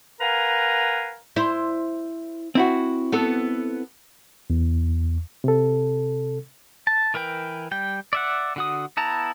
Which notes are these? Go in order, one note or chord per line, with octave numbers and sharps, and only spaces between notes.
A#4 B4 F5 F#5 G#5 A#5
E4 C5
C4 E4 F#4
B3 A4
E2
C3 A4
A5
E3 A#4 B4 G5
G3 G5
D5 E5 F#5
D3 F#4 D#6
B3 E4 A5 A#5